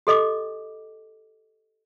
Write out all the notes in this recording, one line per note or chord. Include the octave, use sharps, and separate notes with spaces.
G4 A4 D#5 D6